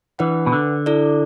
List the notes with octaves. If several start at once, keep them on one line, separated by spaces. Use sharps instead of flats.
E3 D4 B4 F#5
B2
D3
E4 A4 D5